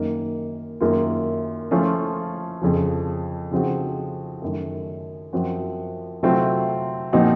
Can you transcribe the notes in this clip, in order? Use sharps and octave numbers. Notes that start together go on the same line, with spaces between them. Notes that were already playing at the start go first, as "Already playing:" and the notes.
Already playing: F#2 D#3 A#3 D#4
F#2 D#3 A#3 F4
F3 A3 C#4 F4
F2 C#3 F3
C#3 F3 C4 D#4 F#4
F#2 D#3 A3
F#2 F3 C4 F#4
C3 F#3 A3 C4 F4
A#2 F3 C4 D#4 F#4